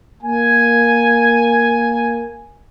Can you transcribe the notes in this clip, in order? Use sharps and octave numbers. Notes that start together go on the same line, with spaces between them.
A#3 G#5